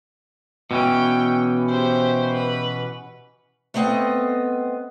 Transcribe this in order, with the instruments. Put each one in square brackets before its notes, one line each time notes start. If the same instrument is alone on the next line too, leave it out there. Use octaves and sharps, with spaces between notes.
[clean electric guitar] B2 E3 C#4 [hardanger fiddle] G5
[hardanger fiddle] G4 C5
B4
[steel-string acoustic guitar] A3 B3 C4 D#5